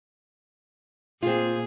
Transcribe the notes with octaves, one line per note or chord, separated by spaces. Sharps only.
A#2 C4 F4 G#4